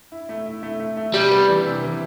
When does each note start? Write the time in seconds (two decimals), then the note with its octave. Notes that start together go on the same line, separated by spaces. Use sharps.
0.12 E4
0.29 A3
0.46 E4
0.63 A3
0.80 A3
0.97 A3
1.14 C3 G3
1.31 B3
1.48 E3
1.65 C3
1.83 E3